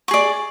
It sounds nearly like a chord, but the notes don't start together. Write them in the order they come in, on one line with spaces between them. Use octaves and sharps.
C#6 G#4 D5